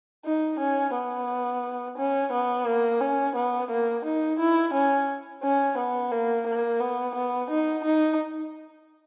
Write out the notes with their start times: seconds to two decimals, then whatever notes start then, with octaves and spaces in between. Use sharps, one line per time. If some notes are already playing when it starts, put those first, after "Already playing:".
0.25 D#4
0.59 C#4
0.94 B3
1.98 C#4
2.32 B3
2.66 A#3
3.01 C#4
3.35 B3
3.70 A#3
4.05 D#4
4.39 E4
4.73 C#4
5.43 C#4
5.78 B3
6.12 A#3
6.47 A#3
6.80 B3
7.15 B3
7.50 D#4
7.84 D#4